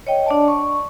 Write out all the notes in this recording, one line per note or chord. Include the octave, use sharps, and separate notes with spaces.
C#5 D#5 G5
D4 D5 A5
C#6